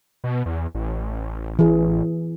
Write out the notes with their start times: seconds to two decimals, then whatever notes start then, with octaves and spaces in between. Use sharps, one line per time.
0.24 B2
0.46 E2
0.75 A1
1.59 E3 G#4